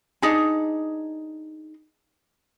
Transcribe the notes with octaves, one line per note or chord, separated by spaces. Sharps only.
D4 D#4 G#4